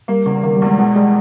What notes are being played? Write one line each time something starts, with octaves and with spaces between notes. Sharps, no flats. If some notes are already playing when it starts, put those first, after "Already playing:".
G3 A#3
E2 C#3
D#3 A#3
G3
E2 G#3
B2 G#3
G3 G#3